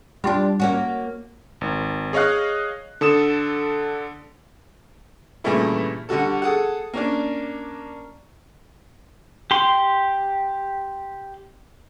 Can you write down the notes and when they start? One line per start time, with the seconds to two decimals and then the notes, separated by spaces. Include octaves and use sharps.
0.24 G3 D4 F4 G4
0.60 A#3 C#4 F#4
1.61 G#1
2.13 G#4 C#5 D#5 F5 F#6
3.01 D3 A4 D#6 E7
5.44 G2 A#2 C#3 E3 A3 E4
6.09 D3 G3 F#4 A4
6.42 G#4 A4 F#5
6.94 A#3 C#4 D4
9.51 G4 C6